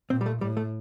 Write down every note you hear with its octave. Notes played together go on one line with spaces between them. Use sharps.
A#2 C4
G3
A3
A2 G3
A3